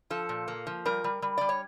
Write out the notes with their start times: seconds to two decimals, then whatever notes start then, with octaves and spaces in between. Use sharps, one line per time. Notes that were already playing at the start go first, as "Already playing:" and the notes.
0.10 F3 A4
0.29 A#2
0.48 A#3
0.67 F3
0.85 G3 A#4
1.04 G3
1.22 G3
1.38 G3 D5
1.49 C#5